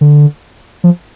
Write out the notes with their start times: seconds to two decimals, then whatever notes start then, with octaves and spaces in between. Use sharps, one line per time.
0.01 D3
0.84 F3